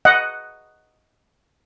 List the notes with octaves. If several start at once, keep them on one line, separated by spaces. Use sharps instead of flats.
D#5 F#5